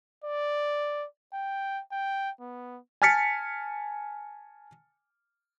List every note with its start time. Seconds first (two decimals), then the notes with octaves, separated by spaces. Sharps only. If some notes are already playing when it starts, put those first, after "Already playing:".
0.24 D5
1.34 G5
1.92 G5
2.41 B3
3.02 G#5 A5 F6 A6 B6 C#7